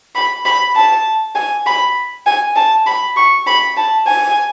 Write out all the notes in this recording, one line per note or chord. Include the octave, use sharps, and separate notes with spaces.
B5
B5
A5
G#5
B5
G#5
A5
B5
C#6
B5
A5
G#5